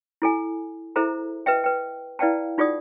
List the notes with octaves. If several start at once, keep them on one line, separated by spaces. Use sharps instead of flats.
E4 A4 G#5
E4 G#4 A4 C5 E5 A#5
B4 D#5 E5 G5
B4 G5
E4 B4 D5 F5 G5 A5
D#4 F4 G#4 D5 F#5 D#6